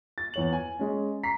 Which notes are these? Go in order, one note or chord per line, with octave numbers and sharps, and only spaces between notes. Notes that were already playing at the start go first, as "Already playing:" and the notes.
A6
E2 C#5 F#7
G#5
G#3 C#4
A#5 B6 C7